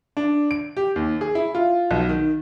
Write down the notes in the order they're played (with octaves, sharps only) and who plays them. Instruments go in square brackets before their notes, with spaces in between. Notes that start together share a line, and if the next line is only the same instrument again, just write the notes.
[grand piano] D4
D7
G4
D#2
G#4
E4
F4
B1
D#3